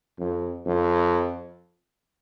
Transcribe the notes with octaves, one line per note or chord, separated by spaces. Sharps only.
F2
F2